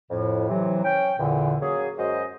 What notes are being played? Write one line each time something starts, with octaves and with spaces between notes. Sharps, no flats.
F2 A2
C3 E3 F#3
C#4 G5
E2 A#2 D3
F#3 A#3 C#4 G#4
F#2 G#3 F#4 C5 D#5